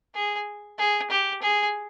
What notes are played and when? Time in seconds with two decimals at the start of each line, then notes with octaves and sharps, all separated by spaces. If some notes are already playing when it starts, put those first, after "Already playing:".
0.15 G#4
0.79 G#4
1.10 G4
1.42 G#4